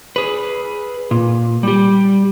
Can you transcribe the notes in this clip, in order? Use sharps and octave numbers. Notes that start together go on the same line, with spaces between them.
G#4 B4
A#2
G3 G4